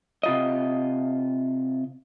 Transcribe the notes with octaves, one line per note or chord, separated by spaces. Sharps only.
C3 F4 D#5